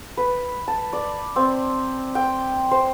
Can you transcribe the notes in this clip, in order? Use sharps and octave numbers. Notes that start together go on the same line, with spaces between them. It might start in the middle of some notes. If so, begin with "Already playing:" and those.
B4
A5
D5
C4
G5
C5